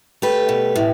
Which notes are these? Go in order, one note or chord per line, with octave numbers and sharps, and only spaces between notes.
A3 G4 B4
B2
A2